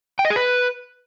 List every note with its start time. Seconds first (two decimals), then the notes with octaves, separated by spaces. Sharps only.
0.19 G5
0.25 D#5
0.30 G#4
0.36 B4